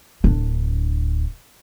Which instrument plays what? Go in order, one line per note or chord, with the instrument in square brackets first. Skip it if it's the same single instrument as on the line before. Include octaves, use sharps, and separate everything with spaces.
[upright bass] D1 D4